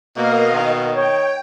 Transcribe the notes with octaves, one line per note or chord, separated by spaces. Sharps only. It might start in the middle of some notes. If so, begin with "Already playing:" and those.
B2 A#3 A#4 D#5 F5
D#3
C#5 G5